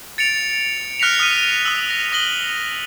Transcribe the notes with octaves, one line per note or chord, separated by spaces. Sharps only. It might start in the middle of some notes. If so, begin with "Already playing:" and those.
A6 C#7 D7 F7
F6 F#6 A#6 B6 C#7 F7
D#6 F6 B6 C#7 D#7
D#6 E6
A#6
D#6 A#6 D#7 F#7 G7